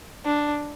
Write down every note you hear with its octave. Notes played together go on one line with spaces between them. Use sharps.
D4